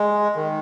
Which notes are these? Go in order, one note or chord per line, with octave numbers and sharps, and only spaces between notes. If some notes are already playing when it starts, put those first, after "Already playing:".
Already playing: G#3
D#3